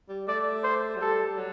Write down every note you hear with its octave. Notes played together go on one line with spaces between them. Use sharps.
G3
A3 D5
C5
F#3
G3 A4
F#3